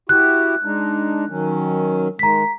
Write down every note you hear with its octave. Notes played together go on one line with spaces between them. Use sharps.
E4 F#4 G4 F#6
G#3 D4 D#4
D#3 F#3 C#4
D#3 G#3 A#5 B6